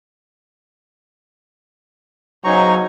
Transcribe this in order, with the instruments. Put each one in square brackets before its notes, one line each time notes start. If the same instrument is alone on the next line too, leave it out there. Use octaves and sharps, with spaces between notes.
[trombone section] B1 C#3 C5 [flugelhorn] F#3 [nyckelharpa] D#4 G#5 [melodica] A#5 C#6